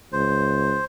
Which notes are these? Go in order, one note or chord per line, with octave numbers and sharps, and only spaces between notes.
C#2 C5